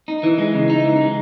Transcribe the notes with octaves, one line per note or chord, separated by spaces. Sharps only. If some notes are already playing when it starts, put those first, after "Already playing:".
D#4
E3
G#3
C#3
D#4
E3
G#3